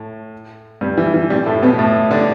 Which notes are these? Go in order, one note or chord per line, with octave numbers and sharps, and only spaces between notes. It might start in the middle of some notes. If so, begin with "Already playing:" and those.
Already playing: A2
G2 G3
E3
E3
G2 G3
A2 A3
B2 B3
A2 A3
D3 D4